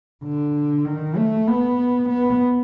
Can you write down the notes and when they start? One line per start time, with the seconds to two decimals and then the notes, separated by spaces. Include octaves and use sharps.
0.24 D3
0.85 D#3
1.16 A3
1.47 B3
2.09 B3